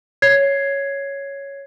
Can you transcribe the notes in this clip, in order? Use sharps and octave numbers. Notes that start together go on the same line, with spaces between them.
C#5 G#6 C7